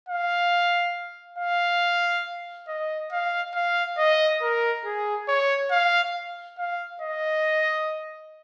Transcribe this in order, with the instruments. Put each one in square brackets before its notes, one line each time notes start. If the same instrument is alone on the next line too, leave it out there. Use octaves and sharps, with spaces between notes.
[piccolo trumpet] F5
F5
D#5
F5
F5
D#5
A#4
G#4
C#5
F5
F5
D#5